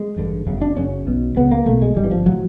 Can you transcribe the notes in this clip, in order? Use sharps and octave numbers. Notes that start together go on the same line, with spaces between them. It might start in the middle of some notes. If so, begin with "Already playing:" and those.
Already playing: G#3
A1 G2 D3
G1 F#2 C#3
D4
F#1 F#2 C#3 C#4
B1 B2
C#2 C#3 B3
A#3
B1 B2 A3
G#3
G#1 G2 D3 G3
E3
F3
A2 F#3